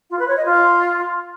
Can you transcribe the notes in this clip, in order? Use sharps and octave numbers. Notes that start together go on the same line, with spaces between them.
F4
B4
C#5
D#5
F4